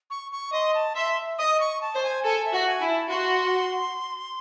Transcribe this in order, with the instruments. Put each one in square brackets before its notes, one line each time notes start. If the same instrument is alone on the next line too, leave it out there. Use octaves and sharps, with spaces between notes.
[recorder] C#6
C#6
[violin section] D#5 [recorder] C6
[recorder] A5
[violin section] E5 [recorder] C6
[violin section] D#5 [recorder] D#6
[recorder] C#6
A5
[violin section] C5
[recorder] G#5
[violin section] A4 [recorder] G#5
[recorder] E5
[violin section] F#4
[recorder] G#5
[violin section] E4
[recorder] A5
[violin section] F#4 [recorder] C6